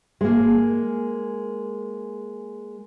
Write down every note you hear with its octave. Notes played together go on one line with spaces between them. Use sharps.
G#3 A#3